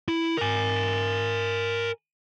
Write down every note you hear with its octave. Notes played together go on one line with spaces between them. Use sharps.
E4
A#4 G#5